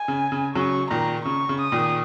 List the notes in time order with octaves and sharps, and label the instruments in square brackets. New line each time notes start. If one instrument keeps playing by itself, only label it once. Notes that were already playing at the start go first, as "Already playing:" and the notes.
Already playing: [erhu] G#5
[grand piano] C#3
C#3
[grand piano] C#3 F#3 [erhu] C#6
[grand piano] A#2 D#3 [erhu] A#5
[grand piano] C#3 [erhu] C#6
[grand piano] C#3
[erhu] D#6
[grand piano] A#2 D#3